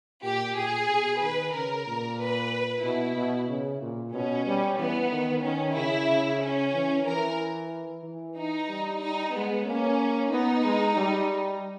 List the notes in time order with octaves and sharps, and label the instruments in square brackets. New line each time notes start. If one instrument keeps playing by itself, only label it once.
[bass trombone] A#2 [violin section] G4
[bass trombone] A#2 [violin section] G#4
[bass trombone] B2
[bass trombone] D#3 [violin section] B4
[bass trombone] C#3 [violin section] A#4
[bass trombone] A#2
[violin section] B4
[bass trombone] B2 [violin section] E4
[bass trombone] B2
C#3
A#2
[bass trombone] B2 [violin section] C#4
[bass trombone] G3
[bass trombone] E3 [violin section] B3
[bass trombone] D#3
[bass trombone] D#3 [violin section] C#4
[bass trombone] C#3 [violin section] E4
[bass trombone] C#3
[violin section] C#4
[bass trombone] E3
[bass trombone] E3 [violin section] A#4
[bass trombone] E3
[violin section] D#4
[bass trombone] G3
[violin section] D#4
[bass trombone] G#3 [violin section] B3
[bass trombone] A#3 [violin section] C#4
[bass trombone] B3 [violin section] D#4
[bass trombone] G#3
G3